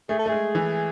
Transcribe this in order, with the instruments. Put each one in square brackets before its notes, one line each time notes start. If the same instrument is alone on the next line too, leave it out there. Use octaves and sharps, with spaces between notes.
[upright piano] A3 [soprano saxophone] G#4
[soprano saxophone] A4
[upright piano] A3
[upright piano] G#3 [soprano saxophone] G#4
[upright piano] E3